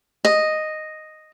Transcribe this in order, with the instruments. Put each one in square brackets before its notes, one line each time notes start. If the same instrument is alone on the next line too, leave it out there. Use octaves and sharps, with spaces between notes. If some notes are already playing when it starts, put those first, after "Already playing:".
[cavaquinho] D#5